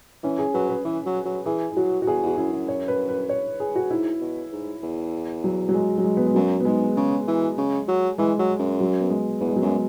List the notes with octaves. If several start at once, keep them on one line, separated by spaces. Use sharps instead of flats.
E3 C#4
G#4
F#3 B4
B4
E3
F#3
F#3
E3 G#4
E4
F#3 F#4
F#4
E2 G#4
E2 F#4
F#2 E4
F#2
C#5
B4
B4
C#5
G#4
F#4
G#2 E4
B2
G#2
E2
F#3
F#3
G#3
F#3
G#3
B3
G#3
F#2 F#3
B3
G#2 G#3
C#3
E3
C#3
F#3
E3 G#3
F#3
F#2
F#3
B3
G#3
E2 B3
G#3
F#3
F#2 G#3